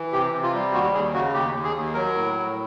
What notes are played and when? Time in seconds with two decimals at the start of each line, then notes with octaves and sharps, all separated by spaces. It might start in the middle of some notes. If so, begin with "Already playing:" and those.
Already playing: E3
0.12 C3 G4
0.33 C3
0.43 F4
0.54 G3
0.73 D#2 F#4
0.93 D#2 G#4
1.13 C#3 F#4
1.34 D#2 G4
1.55 D#2
1.64 G#4
1.75 D#2
1.94 F#3 A#4
2.15 A2
2.34 A2